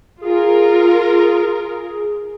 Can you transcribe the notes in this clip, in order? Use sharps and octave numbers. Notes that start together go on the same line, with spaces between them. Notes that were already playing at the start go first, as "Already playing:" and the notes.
F4 G#4 A#4